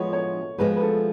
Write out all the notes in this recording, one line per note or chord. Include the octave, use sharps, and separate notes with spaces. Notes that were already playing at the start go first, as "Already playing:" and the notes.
Already playing: F3 G#3 B3 C#5
C#5
F3 G#3 B3 B4
B4
A4